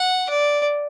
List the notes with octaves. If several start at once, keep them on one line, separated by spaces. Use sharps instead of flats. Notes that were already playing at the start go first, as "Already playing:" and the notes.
Already playing: F#5
D5